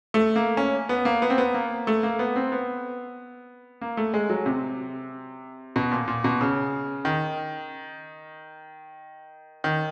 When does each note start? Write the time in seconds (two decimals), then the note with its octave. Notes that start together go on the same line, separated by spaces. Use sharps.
0.14 A3
0.36 A#3
0.57 C#4
0.89 B3
1.05 A#3
1.22 B3
1.30 C4
1.38 B3
1.54 A#3
1.87 A3
2.03 A#3
2.19 B3
2.36 C4
2.52 B3
3.81 A#3
3.97 A3
4.14 G#3
4.30 F#3
4.46 C3
5.76 B2
5.91 A#2
6.08 A#2
6.24 B2
6.41 C#3
7.05 D#3
9.64 D#3